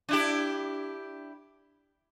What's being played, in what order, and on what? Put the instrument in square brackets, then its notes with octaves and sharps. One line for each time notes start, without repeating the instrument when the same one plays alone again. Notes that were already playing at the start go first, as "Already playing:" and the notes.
[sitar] D4 E4 G4